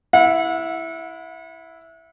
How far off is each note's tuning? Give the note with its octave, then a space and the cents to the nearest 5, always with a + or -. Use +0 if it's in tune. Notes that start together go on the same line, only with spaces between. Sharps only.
E4 +0 F#5 -40